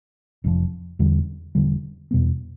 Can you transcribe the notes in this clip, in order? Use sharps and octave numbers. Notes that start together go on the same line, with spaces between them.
F1 F2 C3 F3
E1 E2 D3 G3
E1 E2 D3 G3
E2 B2 G3 B3